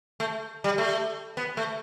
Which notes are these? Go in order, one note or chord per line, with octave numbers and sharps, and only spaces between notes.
A3
G3
A3
B3
A3